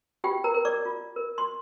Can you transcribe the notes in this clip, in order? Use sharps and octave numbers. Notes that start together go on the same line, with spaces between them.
F4 G4 G5
A#4 A#5
A#4
D5 D6
F4
A#4
C6